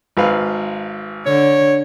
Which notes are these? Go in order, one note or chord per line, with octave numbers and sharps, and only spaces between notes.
G#1 B4 F5
D3 C#5